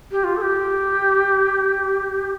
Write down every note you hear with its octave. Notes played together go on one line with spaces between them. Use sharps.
G4
F4
A4
G4